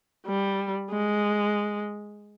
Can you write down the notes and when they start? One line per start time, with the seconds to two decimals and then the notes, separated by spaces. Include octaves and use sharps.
0.26 G3
0.90 G#3